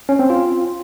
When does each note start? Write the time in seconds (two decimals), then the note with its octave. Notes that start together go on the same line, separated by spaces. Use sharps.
0.09 C#4
0.19 C4
0.30 F4